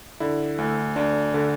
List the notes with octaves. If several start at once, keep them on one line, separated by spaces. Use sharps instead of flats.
D3 E4
D2
D2 D4
D3